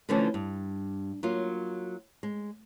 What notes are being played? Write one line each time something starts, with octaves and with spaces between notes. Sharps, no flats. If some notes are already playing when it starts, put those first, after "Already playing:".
D3 E3 F3 A3 C#4 D4
G2
F#3 A#3 F4
G#3